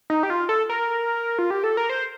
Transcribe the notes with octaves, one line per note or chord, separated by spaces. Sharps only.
D#4
G4
F4
A4
A#4
F4
G4
A4
A#4
C5